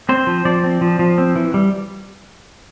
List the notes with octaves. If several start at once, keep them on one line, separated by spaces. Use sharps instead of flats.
C4 C5
F3
F3 D5
C4
F3
F3
C4
E3
G3